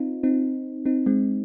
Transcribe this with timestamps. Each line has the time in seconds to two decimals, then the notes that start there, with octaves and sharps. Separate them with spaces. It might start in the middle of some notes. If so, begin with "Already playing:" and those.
Already playing: C4 D#4 F4
0.23 C4 D#4
0.86 C4 D#4
1.06 G#3 C4